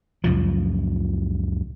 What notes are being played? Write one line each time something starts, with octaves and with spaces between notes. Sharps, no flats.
C#2 F#2 A#2 F3